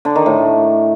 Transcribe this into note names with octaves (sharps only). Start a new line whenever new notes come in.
D3
D#3
A2